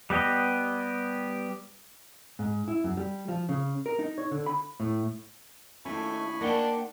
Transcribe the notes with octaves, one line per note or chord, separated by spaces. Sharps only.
G3 B3 G4 D#5
G#2
E4
F#2
G3
F3
C#3
A#4
D#4
C#5
D3
B5
A2
D#2 A2 A3 C#4 G#5 B5 C#6
A#3 D4 D#4 A#4 F#5 G5